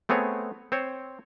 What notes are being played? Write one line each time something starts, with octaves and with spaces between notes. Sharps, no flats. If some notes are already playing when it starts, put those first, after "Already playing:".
A3 B3 C4 G#4 C#5
C4 C5 C#5